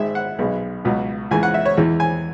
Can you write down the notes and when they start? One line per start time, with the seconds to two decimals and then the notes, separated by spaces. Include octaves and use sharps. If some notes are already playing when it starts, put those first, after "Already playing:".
Already playing: G#1 G#2 G#3 E5
0.15 F#5
0.39 B1 B2 G#3
0.85 C#2 B2 F#3
1.31 C#2 C#3 E3 G#5
1.43 F#5
1.54 E5
1.66 C#5
1.77 E2 E3 G#3
2.00 G#5